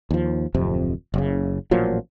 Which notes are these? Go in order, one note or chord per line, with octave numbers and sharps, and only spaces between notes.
D#2 F3
D1 F2 C3
F#1 C#3
A1 A#2 F3 F#3